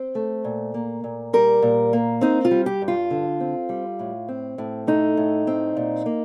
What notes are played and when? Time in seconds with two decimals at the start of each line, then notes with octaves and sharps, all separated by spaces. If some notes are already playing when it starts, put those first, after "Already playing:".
Already playing: C4 C5
0.15 A3
0.45 A#2
0.74 A#3
1.04 A#2
1.33 G3 A#4
1.62 A#2
1.93 A#3
2.21 C4 D#4
2.45 F4
2.51 G3
2.66 G4
2.82 G2
2.88 F4
3.10 D3
3.40 C4
3.69 G3
3.99 A2
4.28 C4
4.58 A2
4.87 A3 D#4
5.17 A2
5.47 C4
5.77 A#2
6.06 A#3